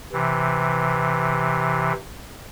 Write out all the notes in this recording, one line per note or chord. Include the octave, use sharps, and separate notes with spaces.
C3 E3